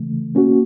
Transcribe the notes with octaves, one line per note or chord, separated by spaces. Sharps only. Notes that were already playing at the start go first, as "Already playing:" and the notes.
Already playing: C#3 E3 A3
A#3 C#4 F#4